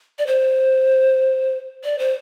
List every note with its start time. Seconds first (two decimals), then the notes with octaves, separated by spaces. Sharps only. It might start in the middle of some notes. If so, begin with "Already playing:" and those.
0.19 D5
0.27 C5
1.84 D5
1.99 C5